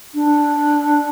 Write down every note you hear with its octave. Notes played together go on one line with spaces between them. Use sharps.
D4